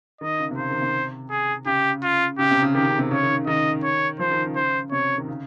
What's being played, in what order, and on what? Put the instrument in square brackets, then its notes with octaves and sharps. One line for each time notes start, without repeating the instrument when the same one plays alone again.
[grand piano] D#3 [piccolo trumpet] D#5
[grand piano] C#3
C3
[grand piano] C#3 [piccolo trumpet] C5
[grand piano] D#3
C3
[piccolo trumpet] G#4
[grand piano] C#3 [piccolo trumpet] G4
[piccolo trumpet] F4
[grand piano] C#3 [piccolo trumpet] G4
[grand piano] C3
C#3
[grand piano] D#3 [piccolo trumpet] G4
[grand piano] C#3
C3
[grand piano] C#3 [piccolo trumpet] C#5
[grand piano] D#3
C#3
[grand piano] D#3 [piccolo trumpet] D#5
[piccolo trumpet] C#5
[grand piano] F3 [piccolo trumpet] C5
[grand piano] D#3
C#3
[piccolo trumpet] C5
[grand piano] C3 [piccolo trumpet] C#5
[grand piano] D#3
C#3